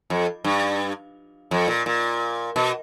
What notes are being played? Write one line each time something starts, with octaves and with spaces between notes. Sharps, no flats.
F2
G2
F2
A#2
A#2
B2